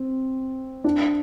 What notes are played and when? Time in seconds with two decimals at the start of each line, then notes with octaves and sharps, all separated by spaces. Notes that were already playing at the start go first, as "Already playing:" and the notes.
Already playing: C4
0.84 D4